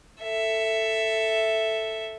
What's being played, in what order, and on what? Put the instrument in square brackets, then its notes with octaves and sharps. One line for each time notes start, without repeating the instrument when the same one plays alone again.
[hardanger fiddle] A4 E5